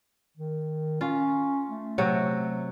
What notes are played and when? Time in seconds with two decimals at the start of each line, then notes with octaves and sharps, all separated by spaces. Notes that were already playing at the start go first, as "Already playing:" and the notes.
0.37 D#3
1.01 C#4 F4
1.68 A3
1.98 C3 F#3 F#4